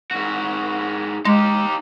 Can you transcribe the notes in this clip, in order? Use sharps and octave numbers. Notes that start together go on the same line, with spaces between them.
G#2 F#4
G#3 D#4 G4